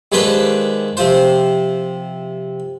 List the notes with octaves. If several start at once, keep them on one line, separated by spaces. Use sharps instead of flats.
D#2 G#3 D4 B4 C5 G5
C3 F3 C5